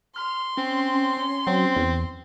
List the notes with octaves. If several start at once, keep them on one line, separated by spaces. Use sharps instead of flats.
C6 F6
C4 C#4
C#4
F#3 C4
E2